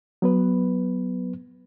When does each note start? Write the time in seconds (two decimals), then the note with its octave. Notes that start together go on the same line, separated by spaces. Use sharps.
0.22 F#3 B3 B4